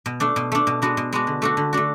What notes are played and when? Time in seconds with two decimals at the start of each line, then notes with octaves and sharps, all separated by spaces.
0.06 B2
0.20 A3 D4
0.36 B2
0.52 A3 D4
0.67 B2
0.82 G#3 B3 D4 F#4
0.97 B2
1.13 G#3 B3 D4 F#4
1.27 D3
1.42 A3 D4 F#4
1.57 D3
1.73 A3 D4 F#4